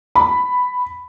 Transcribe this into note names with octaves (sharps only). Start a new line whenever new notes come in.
B5